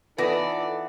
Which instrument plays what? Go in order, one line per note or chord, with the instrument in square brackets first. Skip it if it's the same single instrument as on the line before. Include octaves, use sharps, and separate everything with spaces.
[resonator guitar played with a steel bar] E3 B3 [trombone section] D#4 A4 [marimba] F4 B4 A#6 [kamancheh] D5